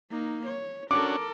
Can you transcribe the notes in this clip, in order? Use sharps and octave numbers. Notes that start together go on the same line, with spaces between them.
A#3 D#4
C#5
C#4 D4 F#4 A4 A#4 D6